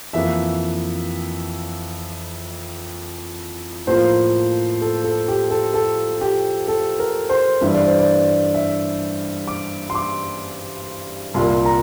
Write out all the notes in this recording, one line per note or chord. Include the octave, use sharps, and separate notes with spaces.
F2 E3 A#3 E5
A2 F3 A#3 C5
A4
A4
G4
A4
A4
G4
A4
A#4
C5
G2 E3 G3 E5
D5
C5
D5
E5
D6
C6
D6
C2 A#2 G3 A#3 C6
A#5